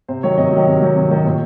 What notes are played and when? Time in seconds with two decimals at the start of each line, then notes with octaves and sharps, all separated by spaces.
0.08 C3 C5
0.23 D#3 F#3 C#5
0.38 C3 D#5
0.52 D#3 F#3
0.67 C3
0.82 D#3 F#3
0.96 C3
1.10 D#3 F#3
1.25 A#2